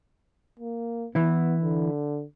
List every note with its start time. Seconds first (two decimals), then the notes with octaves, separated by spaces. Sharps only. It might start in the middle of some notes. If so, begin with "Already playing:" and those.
0.59 A#3
1.15 E3 B3 E4
1.61 D3